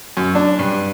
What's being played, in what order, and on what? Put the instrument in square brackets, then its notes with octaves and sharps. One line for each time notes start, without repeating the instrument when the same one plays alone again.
[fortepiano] F#2
D4
G2